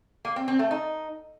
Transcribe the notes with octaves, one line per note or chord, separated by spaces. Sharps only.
A#3
C4
C4
A3
D#4